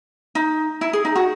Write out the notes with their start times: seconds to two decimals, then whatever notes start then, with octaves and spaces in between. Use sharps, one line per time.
0.35 D#4
0.81 E4
0.93 G#4
1.05 D#4
1.16 F#4